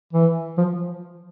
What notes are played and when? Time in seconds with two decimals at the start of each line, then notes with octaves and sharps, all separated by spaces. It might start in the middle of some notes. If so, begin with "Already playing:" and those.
0.13 E3
0.58 F3